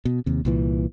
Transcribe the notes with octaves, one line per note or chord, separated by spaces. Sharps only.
B2
D#2 C3
C2 A#2 E3